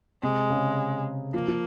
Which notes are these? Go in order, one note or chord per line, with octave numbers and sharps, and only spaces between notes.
C3 G#3
C#3
F3 A#3
F3